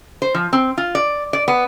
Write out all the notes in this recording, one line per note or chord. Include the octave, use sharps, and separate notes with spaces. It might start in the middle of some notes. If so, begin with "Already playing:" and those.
C5
F3
C4
F4
D5
D5
B3